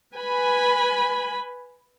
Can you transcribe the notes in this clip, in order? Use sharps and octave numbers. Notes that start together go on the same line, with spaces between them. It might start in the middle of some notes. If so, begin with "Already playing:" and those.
B4 G#5 B5